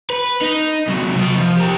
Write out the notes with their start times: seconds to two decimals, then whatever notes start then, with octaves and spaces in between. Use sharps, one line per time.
0.10 B4
0.41 D#4
0.87 C3 F#3
1.16 C3 D#5
1.36 F3
1.56 G4 A#4